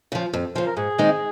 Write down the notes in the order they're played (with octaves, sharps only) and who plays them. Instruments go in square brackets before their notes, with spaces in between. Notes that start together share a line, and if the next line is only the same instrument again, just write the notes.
[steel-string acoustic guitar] C#3 F3
F2
[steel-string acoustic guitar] C#3 F3 [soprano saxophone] C5
[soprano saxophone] A#4
[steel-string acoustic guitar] G#2 [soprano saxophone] G#4
[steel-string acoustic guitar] D#3 G#3 C4 D#4